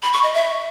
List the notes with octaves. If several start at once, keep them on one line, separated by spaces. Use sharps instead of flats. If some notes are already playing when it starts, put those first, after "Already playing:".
B5
C#6
D#5
E5